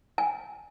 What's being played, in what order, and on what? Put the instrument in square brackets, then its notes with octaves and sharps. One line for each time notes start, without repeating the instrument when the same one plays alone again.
[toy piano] G#5